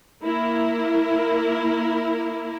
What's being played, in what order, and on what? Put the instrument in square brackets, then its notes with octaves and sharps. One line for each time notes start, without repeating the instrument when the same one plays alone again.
[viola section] A#3 E4 A#4